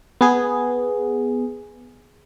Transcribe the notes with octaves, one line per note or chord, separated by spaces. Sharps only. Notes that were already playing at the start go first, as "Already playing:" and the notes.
B3 G#4